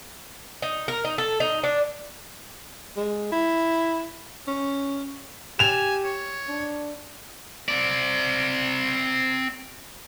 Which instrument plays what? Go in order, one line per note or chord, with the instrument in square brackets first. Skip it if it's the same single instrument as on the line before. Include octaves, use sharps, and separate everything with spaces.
[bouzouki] D#4
A#4
D#4
A4
D#4
D4
[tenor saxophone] G#3
E4
C#4
[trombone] G4 [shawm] G#5 [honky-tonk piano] E7 F7
[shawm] C#5
[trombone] D4
[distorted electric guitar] C4 D5